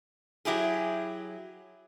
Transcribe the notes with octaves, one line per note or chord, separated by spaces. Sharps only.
F#3 E4 G4 G#4